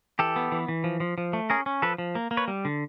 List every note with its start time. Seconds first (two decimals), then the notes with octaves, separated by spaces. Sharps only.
0.19 E3 G4 A4
0.36 B3
0.52 E3
0.68 E3
0.84 F3
1.00 F3
1.18 F3
1.33 A3
1.50 C#4 G#4 A#4
1.66 C#4
1.82 F3 A4 B4
1.98 F3
2.15 A#3
2.31 A#3
2.37 B4 C#5
2.48 G3
2.65 D3